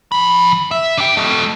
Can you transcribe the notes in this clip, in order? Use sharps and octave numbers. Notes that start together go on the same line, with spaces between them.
F3 B5
E5
D4 G5
A3 D#5